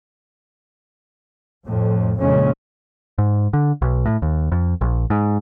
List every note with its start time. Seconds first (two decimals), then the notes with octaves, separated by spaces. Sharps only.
1.66 F2 A2
2.18 F2 A#2 C#3 G#3 C#4
3.18 G#2
3.53 D3
3.82 B1
4.06 A2
4.22 D#2
4.52 F2
4.81 A#1
5.10 G#2